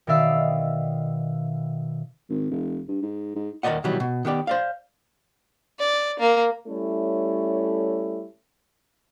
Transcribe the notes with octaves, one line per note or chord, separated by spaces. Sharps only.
B2 D#3 D5 E5 F5 E6
G#1
F1
G2
G#2
G#2
D#2 A#4 C5 D5 D#5 F#5
B2 D#3 E3 F#3 G3
B2
D#3 B3 G4 D5
C5 D5 F5
D5
A#3
G3 A3 C#4 E4 A4 C#5